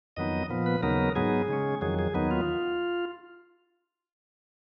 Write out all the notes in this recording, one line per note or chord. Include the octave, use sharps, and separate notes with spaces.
F2 D#3 F#3 B3 D#4 D#5
A#2 F3 B3
B4
D#2 C#3 F#3 B3 D#4 A#4
G#2 F#3 B3 D#4 G#4
C#3 G#3 C#4
F2 D#3 F#3 G#4
G#4
D#2 D#3 F#3 B3 D#4
F4